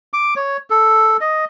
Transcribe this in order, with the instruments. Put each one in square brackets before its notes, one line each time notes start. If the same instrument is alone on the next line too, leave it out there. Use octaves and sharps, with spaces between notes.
[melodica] D6
C#5
A4
D#5